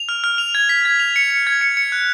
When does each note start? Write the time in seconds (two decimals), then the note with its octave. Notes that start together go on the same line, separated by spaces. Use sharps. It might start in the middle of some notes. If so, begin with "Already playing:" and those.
Already playing: F7
0.09 F6
0.24 F6
0.38 F7
0.55 G#6
0.69 B6
0.85 G#6
1.00 F7
1.16 C#7
1.31 C#7
1.47 G#6
1.61 C#7
1.77 C#7
1.92 F#6